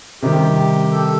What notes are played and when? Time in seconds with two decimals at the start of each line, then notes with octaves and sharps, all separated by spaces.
0.22 C3 D#3 G3 G4
0.91 A4